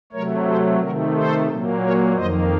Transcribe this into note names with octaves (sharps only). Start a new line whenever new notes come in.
C3 F#3 A3 A#4 C#5
A4 C5
C3 D#3 A3 F#4 A#4
A4 C5
A#2 F#3 A#3
A#4 C#5
F2 D#3 A#3 C5 D#5